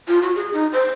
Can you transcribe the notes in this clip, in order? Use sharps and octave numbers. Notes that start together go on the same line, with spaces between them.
F4
F#4
G#4
D#4
C5